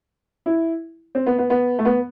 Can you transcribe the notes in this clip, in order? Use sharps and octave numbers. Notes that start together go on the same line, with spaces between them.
E4
C4
B3
B3
B3
A3
B3